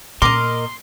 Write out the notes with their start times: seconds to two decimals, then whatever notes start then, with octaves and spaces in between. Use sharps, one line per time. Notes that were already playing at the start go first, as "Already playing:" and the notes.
0.22 A#2 A#4 D#5 C6 D6